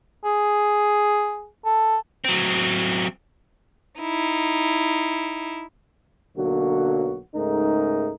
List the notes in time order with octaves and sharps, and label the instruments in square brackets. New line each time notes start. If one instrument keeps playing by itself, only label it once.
[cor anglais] G#4
A4
[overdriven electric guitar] F#3 C4
[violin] D#4 E4
[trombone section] B1 D3 F#3 A#3 F#4
C#2 G#2 A3 D#4 A#4